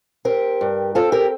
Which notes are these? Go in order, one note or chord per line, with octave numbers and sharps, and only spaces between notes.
C4 G4 A#4
G2
C4 F4 A4
G4 A#4